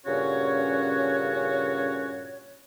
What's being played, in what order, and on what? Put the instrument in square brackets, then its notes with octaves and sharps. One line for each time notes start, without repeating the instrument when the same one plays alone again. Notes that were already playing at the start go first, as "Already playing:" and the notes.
[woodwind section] G2 A#2 C#3 C#4 F#4 C#5